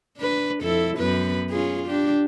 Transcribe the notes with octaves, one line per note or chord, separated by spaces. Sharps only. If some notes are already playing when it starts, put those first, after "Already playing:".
D4 B4
F2 E4 A4
F#2 B3 B4
C#4 F4 G#4
D4 G4